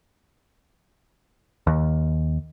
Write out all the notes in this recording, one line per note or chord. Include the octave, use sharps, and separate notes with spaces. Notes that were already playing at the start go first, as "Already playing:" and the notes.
D#2